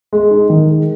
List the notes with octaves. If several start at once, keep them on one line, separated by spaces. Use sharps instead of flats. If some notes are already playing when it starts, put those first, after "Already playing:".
G#3
D#4
D#3
G#3